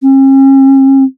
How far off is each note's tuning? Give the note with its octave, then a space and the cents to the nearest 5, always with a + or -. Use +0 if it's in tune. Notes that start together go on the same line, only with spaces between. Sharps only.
C#4 -45